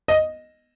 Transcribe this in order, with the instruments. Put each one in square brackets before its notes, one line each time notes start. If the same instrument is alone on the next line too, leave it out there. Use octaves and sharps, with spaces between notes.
[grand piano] D#5